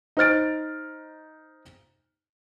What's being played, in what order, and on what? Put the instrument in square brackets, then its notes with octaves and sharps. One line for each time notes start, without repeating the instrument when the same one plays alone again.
[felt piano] D#4 C5 F6 A6 D7